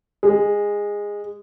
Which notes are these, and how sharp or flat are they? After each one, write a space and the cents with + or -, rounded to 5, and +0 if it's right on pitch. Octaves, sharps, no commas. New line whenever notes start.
G#3 -15